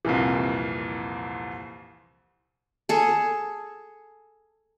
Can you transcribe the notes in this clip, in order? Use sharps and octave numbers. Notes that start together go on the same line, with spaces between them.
C2 F2 A#2 E3
G#4 A4